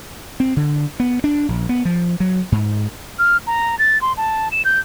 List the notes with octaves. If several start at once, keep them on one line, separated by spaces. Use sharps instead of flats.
C4
D3
B3
D4
A#1
B3
F3
F#3
G#2
F6
A#5
A6
C6
A5
E7
G6